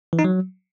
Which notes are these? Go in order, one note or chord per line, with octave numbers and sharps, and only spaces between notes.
E3
D#4
F#3